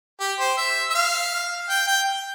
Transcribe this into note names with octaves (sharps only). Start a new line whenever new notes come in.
G4
C5
E5
E5
F5
G5
G5